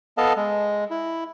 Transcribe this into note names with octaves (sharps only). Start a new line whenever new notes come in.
B3 A4 D#5 F5 A5
G#3
E4